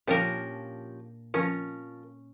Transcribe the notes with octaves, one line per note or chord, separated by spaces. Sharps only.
A#2 F3 C#4 D4 G4 A#4
F3 C#4 A#4